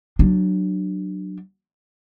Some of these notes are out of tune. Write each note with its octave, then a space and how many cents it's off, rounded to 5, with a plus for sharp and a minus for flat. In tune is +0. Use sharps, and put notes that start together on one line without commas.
F#3 +10 D4 +20